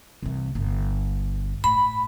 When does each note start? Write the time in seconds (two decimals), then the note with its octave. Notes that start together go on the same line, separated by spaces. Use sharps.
0.22 C2 E3
0.55 G1 G2
1.64 A2 B5